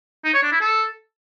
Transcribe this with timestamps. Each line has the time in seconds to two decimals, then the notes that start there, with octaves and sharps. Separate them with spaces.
0.25 D#4
0.34 C#5
0.43 D4
0.52 E4
0.61 A4